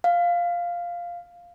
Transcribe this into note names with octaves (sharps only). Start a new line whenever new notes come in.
F5